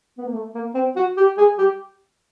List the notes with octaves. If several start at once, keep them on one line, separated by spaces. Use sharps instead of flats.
B3
A#3
A3
A#3
C4
F#4
G4
G#4
G4